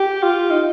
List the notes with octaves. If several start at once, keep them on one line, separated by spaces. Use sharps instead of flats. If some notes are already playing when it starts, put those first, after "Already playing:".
Already playing: G4
F4
D#4